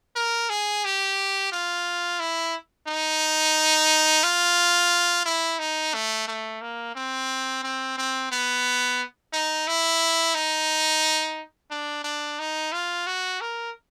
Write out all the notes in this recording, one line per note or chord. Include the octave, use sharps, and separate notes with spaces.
A#4
G#4
G4
F4
E4
D#4
F4
E4
D#4
A3
A3
A#3
C4
C4
C4
B3
D#4
E4
D#4
D4
D4
D#4
F4
F#4
A#4